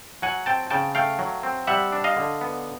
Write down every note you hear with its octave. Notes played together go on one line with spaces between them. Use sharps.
F#3 F#5 G#5
C4 G5 A5
C#3 G5 A5
A3 F5 G5
F#3
C4
G3 E5 F#5
D4
D#5 F5
D3
B3